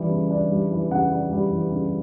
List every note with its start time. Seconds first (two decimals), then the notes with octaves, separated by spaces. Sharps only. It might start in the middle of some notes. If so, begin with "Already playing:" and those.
Already playing: C#3 E3 G3 D4
0.11 C#3
0.31 D4
0.51 G3
0.72 E3
0.91 C#3 F#5
1.12 D4
1.32 G3
1.53 E3
1.72 C#3